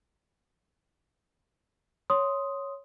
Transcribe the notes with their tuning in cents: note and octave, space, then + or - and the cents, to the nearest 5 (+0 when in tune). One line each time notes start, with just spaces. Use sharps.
C#5 +0 C6 +0 D#6 +5